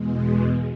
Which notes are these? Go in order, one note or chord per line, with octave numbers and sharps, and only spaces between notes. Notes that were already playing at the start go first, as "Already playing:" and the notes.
Already playing: E2 B2 G#3